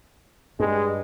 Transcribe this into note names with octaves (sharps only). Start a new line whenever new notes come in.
G2 G#3